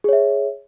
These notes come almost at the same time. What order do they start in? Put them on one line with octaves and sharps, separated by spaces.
G#4 C#5 E5